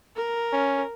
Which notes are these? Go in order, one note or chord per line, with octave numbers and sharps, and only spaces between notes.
A#4
C#4